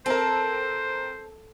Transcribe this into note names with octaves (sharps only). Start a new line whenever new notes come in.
C4 A4 A#4 C5